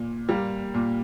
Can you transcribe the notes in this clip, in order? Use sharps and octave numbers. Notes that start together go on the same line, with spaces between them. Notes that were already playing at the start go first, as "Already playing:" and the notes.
Already playing: A#2
G3 A#3
A#2